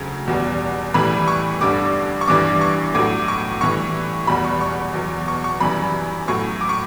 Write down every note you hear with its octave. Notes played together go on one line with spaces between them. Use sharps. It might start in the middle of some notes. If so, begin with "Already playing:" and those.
Already playing: D2 C#3 F#3
E2 B2 G3
A2 E3 G3 B5
C#6
G2 D3 G3 D6
C#6
G2 E3 G3 D6
C#6
A2 F#3 D6
C#6
A2 E3 G3 C#6
E2 B2 G3 B5
C#6
C#6
E2 B2 F#3
C#6
C#6
F#2 E3 G3 B5
A2 F#3 C#6
D6
C#6